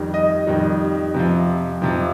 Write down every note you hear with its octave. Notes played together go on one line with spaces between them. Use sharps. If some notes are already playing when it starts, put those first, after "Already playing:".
Already playing: F2 D#3 G3
D#5
F2 D#3 G3
F2 C3 F3
F2 C3 F3